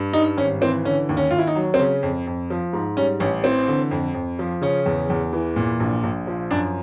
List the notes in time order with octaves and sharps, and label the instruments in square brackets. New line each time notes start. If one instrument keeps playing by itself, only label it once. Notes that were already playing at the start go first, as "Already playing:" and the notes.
Already playing: [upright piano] G2
G3 D#4
G#1 C#4
E3 C4
D3 C#4
D#2
C#4
D#2 F4
E4
D#4
F#3
C4
C#3 C#4
F2
F2
F3
G#2
G3 C#4
A1 C#4
E3 C4
D3
F2
F2
F3
C#3 C#4
E2
E2
E3
A#2
A#1
A#1
F3
F#2 D4